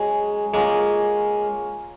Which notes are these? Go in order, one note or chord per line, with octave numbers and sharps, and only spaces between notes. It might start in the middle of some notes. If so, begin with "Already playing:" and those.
Already playing: F#3 G#3 C#4 G#4
G#3 A#3 C#4 F4 A#4